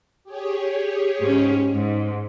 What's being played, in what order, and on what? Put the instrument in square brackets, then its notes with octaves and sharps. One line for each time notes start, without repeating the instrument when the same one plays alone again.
[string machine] G4 G#4 C#5
[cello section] G#2 C#4
G#2